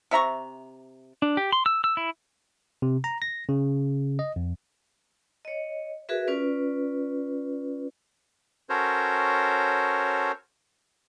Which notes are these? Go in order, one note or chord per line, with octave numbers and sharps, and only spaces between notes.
C3 E5 A#5 C#6
D4
G4
C6
E6
E6
E4
C3
A#5
A#6
C#3
D#5
F2
C#5 D#5
F#4 G#4 A#4 B4 E5
C#4 F4 B4 D5
C#4 F#4 A4 A#4 C5 C#5